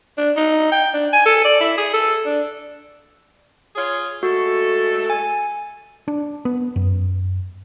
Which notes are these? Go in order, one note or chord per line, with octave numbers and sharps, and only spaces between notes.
D4
D#4
G5
D4
G#5
A4
D5
E4
G#4
A4
D4
F4 G#4 C#5
G#3 A3 F#4 A4
G#5
D4
B3
F#2